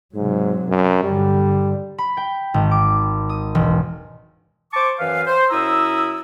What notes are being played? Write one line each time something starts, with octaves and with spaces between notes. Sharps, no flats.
G#2 C3 F#3
F#2
G2 D3 G3
B5
G5
G#1
D6
D#6
E1
C5 A5 C#6 D6
F#2 E3 B4 F5
C5
F#2 E4 A#5 D#6 E6